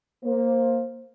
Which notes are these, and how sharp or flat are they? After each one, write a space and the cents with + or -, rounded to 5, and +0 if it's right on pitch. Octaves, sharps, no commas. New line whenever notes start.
A#3 +0 C5 +15